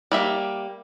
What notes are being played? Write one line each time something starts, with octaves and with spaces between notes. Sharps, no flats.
G3 A#3 E5